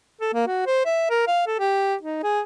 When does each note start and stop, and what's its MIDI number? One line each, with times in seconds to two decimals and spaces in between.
0.21 0.31 69
0.34 0.46 58
0.47 0.64 66
0.67 0.83 72
0.86 1.07 76
1.10 1.24 70
1.27 1.42 77
1.47 1.57 69
1.60 1.95 67
2.03 2.23 63
2.23 2.41 68